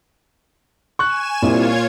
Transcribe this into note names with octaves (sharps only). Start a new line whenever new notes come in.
G#5 C#6 F#6 E7
C2 A#2 F4 C#5 G#6